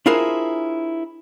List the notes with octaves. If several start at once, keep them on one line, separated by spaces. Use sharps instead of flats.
D4 E4 F4 G#4 A#4 C5